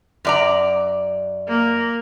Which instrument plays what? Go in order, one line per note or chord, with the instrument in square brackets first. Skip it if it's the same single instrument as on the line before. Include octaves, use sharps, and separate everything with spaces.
[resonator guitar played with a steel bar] F#2 D5 A#5
[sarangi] A#3